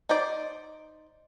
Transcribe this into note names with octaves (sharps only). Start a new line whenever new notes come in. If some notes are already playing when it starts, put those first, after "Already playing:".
D#4 C5 D5